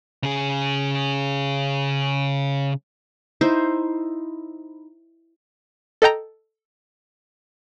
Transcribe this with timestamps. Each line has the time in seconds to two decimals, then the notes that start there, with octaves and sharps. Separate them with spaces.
0.23 C#3 G#4
3.41 D#4 E4 C5
6.02 A4 D#5 G5 A#5